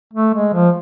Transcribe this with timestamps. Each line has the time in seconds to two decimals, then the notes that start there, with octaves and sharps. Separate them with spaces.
0.13 A3
0.34 G#3
0.53 F3